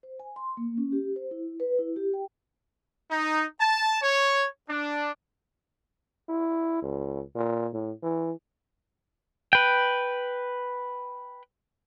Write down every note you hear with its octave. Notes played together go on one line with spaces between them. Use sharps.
C5
G#5
C6
A#3
C#4
G4
C5
E4
B4
E4
G4
G5
D#4
A5
C#5
D4
E4
C#2
A#2
A2
E3
B4 G5